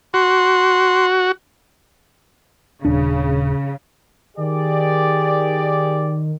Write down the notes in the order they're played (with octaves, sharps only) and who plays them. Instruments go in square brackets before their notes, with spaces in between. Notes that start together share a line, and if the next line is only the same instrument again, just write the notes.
[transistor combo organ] F#4 [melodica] C6
[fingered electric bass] D#1 D4 [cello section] C#3
[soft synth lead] D#3 [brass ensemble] G4 G#4 D5